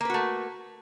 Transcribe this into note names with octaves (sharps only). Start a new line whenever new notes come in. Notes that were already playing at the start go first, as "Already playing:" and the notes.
A3 A#3 F#4 B4